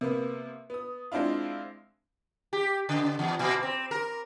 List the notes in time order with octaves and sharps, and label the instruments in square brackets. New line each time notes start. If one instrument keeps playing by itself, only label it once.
[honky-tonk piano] C3 A#3 B3
B3 D#6
G#3 C4 D4 E4 F4
[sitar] G4
C#3
E2
A#2
C4
A#4